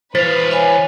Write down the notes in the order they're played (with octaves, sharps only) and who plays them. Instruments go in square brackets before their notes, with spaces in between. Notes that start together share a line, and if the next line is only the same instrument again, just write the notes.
[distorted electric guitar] E3 F5 [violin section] B4 [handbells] C5 A6 B6
[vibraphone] C#5 E5 G#5